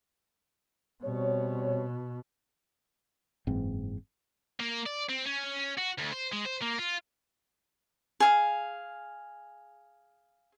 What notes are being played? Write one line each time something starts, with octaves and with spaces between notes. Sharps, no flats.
B2 G3 C4 C#5
F#1 G#2 E3 C4
A#3
D5
C4
C#4
F#4
D2
C5
G#3
C5
A#3
F4
G#4 F5